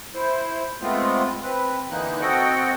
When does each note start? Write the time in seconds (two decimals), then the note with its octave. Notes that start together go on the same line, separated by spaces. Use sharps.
0.14 E4 C5
0.82 G#3 A3 B3 C4 F4
1.43 C4 B4
1.91 D3 E3 A#3 D#4 F#6
2.21 C4 F#4 A4 D#5 F#5 G5